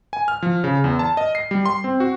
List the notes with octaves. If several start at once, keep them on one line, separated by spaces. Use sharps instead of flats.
G#5
F6
F3
C#3
E2
A5
D#5
C7
G3
C6
C4
F#4